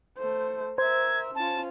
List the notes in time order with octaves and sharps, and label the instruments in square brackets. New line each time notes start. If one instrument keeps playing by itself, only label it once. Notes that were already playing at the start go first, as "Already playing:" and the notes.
[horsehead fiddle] A3 C5
[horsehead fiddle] A#4 E5 [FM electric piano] C5 [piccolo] G#6
[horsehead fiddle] C#4 F4 [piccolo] A5